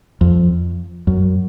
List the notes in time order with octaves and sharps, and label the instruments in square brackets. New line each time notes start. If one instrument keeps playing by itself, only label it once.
[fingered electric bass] F2
F#2